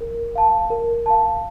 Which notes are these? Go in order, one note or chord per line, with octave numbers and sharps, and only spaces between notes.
A#4
F5 A5
A#4
F5 A5